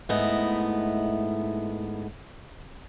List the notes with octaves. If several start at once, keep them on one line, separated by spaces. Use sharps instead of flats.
G#2 A3 B3 E4 D#5